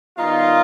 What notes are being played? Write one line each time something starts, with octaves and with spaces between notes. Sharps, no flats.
D#3 G3 B3 D#4 F4